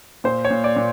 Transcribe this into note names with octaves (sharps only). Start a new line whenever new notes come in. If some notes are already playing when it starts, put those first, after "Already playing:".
A#2 C5
C#5
A#2
D5
A#2